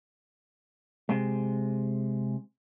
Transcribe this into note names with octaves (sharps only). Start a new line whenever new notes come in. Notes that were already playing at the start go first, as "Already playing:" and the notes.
C3 G#3